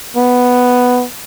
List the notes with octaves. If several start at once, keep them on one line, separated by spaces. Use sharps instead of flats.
B3